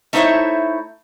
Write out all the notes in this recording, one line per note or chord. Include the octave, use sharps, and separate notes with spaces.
A3 D#4 E4 C5 C#5 E5